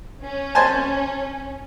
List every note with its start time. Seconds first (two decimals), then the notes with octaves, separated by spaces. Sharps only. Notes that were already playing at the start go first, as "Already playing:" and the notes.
0.24 C#4
0.55 C5 G#5 A5